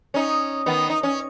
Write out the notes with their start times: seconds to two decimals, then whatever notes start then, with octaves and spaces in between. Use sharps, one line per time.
0.14 C#4 D#4
0.66 D#3 B3
0.90 D#4
1.03 C#4